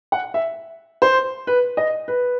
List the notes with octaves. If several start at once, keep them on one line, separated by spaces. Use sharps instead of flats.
F#5
E5
C5
B4
D#5
B4